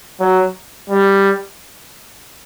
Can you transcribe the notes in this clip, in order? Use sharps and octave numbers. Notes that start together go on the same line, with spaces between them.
F#3
G3